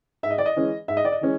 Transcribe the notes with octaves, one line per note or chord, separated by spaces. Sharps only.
G#2 E5
D#5
D5
D#5
E3 G#3 C#4
G#2 E5
D#5
D5
D#5
E3 G#3 C#4